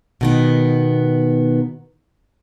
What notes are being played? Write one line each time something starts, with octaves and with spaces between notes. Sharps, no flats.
B2 D#3 B3